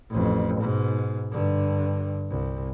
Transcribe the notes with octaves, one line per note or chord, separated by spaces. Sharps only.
A1 F2
G#2 B2
G2 D3
C2